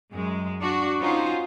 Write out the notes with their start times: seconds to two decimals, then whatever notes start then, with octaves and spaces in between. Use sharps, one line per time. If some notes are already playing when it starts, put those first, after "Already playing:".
0.12 F#2 G#3
0.60 D4 F#4
1.00 C#4 D#4 F4 F#4 C5